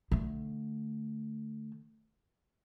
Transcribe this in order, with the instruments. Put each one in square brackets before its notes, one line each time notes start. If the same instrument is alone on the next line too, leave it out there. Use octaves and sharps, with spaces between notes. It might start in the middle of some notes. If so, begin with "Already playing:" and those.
[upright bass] D3 A3